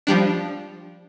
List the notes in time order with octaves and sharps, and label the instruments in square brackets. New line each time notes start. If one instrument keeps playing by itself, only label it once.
[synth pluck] F3 G3 D4